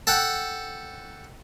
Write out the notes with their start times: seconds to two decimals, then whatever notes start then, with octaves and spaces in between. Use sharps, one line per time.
0.07 A4 F#5 G5